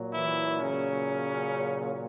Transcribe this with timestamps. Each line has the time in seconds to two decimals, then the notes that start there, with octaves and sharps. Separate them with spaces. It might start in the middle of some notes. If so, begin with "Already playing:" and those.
Already playing: A#2 F#3
0.14 E3 E4
0.59 C#3 C#4